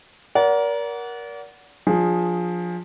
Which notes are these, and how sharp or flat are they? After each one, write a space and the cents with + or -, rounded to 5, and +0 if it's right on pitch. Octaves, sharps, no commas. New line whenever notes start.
A#4 +20 D5 -35 F#5 +0
F3 +15 D4 +0 G#4 +0